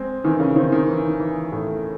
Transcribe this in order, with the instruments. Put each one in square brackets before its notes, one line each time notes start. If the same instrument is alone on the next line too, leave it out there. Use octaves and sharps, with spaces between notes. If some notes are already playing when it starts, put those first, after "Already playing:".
Already playing: [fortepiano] G#3 [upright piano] C4
[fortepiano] D#3 [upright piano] E3
[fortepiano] C#3
[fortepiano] D#3 [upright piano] C4
[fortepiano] D#3
[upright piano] E3
E3
A2